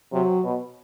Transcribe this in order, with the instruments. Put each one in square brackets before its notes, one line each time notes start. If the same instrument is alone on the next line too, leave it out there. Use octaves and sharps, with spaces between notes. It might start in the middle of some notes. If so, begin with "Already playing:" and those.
[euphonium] C3 [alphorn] F#3
[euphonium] B2